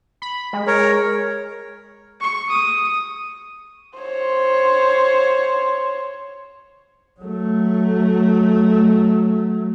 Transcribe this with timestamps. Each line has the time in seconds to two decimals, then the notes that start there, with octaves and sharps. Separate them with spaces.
0.22 B5
0.53 G#3
0.67 A#4 C#5
2.20 C#6
2.49 D#6
3.99 C5 C#5
7.20 F#3 A3